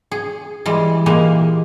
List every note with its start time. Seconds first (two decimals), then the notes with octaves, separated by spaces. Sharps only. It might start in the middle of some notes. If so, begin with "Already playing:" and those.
0.11 G#4
0.66 E3 G3 G#3
1.06 A#2 E3 G#3 A#3 G4